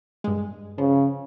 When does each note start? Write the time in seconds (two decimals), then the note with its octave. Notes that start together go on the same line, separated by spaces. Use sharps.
0.24 G2 G#3
0.78 C#3 F3